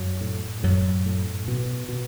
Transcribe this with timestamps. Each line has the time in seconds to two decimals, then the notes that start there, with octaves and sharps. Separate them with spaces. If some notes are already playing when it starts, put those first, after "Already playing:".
Already playing: F#2 F#3
0.21 A2
0.63 F#2 A2 F#3
1.06 A2
1.48 B2
1.89 B2